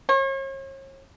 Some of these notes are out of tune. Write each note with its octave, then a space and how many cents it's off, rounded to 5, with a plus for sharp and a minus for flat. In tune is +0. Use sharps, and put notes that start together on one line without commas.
C#5 -40